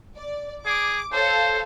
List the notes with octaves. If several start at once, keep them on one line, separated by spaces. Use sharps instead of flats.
D5
G#4 D6
A4 C5 C#5 F5